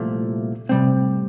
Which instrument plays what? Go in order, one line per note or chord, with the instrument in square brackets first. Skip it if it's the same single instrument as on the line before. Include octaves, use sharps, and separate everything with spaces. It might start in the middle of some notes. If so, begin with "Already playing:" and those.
Already playing: [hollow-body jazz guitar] C2 A#2 F3 A3
[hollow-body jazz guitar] A2 G3 C4 [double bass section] C3